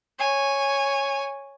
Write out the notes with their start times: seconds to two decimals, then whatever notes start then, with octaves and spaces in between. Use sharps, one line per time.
0.19 C#5 G#5